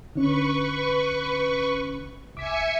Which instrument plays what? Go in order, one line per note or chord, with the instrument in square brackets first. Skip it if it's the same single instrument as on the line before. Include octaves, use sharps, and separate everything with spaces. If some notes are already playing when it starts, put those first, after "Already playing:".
[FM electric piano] D3 C#4 [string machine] B4 C#6
[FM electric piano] C2 D6 B6 [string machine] E5 G#5 C#7